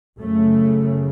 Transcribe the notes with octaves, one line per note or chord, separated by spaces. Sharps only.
F#2 C#3 A3